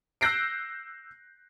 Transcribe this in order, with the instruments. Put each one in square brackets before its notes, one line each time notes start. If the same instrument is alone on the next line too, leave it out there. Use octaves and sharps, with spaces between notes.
[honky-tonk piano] E6 F#6 G6 A#6 C7 D7